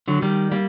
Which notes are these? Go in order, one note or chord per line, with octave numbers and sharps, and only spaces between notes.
D3 F#3
D#3 G3
G3 A#3